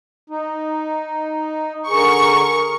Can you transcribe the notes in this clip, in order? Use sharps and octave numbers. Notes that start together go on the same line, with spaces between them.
D#4
D3 G#4 A#4 C#6